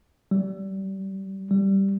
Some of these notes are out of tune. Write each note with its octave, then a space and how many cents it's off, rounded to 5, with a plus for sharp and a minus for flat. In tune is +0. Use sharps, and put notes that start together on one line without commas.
G3 -25
G3 -5